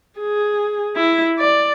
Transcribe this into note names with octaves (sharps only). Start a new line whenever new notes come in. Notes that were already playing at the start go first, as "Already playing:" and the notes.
G#4
E4
D5